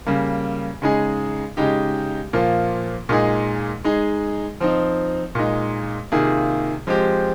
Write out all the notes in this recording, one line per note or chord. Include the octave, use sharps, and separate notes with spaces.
C#3 G3 A#3
C#3 G#3 D#4 G#4
C#3 G#3 D#4 G4
A#2 F3 A#3 F4
A#2 G#3 D#4 G#4
G#3 D#4 G#4
F3 C4 D#4
A#2 G#3 D#4
C3 D#3 A#3 F4 G#4
F3 G#3 C4 G4